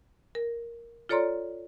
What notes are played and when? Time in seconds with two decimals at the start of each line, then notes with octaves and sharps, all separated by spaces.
0.35 A#4
1.09 F4 A4 C#5 D5 A#5 C6